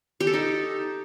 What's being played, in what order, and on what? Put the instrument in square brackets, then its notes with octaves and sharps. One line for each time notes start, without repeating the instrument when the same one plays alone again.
[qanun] G4
A4
D#4